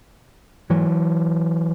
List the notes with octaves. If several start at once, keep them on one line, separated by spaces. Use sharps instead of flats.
G#2 E3 F#3